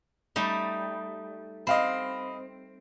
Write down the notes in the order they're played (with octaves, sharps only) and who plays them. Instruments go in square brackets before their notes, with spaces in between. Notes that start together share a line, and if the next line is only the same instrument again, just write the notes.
[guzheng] G3 A3 D#4
[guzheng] C4 [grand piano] D#5 F5 B5